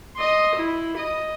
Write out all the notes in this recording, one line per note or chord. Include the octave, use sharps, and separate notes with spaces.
D#5 C6
E4
D#5